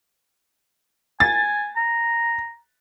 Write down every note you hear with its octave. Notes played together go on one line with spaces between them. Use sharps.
G#5 A6
A#5